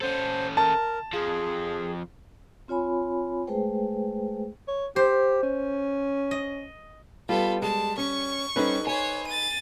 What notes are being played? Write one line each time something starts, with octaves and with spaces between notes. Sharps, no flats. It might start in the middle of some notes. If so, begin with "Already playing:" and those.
C#4 A4 C5
A#4 A5
F2 F3 G#4
C4 F4 C#5 G#5 B5
G#3 A3 G#4 B4 C5 G5
C#5
G4 C5
C#4
D#5
G3 B3 F4 A4
G#3 A5
C#4 C#6
G3 C4 C#4 D#4 A4 B4
C5 C#5 G#5
A6 D#7